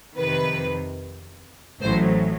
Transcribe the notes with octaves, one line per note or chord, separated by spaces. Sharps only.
F2 C3 D#3 B4
A1 A2 F#3 C5